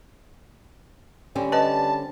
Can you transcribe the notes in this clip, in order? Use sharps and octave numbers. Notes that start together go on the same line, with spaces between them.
D3 G3 C4 C#4
B4 D#5 A5